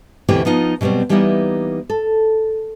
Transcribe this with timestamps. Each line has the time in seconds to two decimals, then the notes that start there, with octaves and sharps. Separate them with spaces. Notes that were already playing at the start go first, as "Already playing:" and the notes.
0.28 D2 B2 E3 C4 G4 G5
0.45 F3 B3 D#4 F4
0.81 B2 F#3 G3 B3 C4
1.09 E3 G3 A#3 B3 D#4 E4
1.90 A4